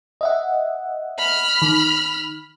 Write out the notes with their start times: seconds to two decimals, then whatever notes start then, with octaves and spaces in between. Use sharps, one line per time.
0.21 D#5 E5 F#5
1.18 B5 F6
1.62 D#3